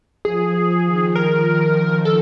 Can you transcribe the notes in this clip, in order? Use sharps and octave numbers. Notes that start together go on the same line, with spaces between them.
F3 G#4
D#3
D#3 A#4
A4